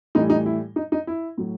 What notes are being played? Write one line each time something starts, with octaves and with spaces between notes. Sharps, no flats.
A2 E3 G3 D#4
D#4
E4
D#4
D#4
E4
A2 F#3